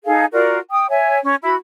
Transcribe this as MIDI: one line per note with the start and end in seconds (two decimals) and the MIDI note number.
0.05 0.26 63
0.05 0.26 68
0.05 0.26 69
0.05 0.26 77
0.32 0.59 65
0.32 0.59 66
0.32 0.59 70
0.32 0.59 74
0.72 0.88 79
0.72 0.88 87
0.89 1.18 73
0.89 1.18 76
0.89 1.18 80
1.23 1.36 61
1.43 1.55 64
1.43 1.55 66
1.43 1.55 83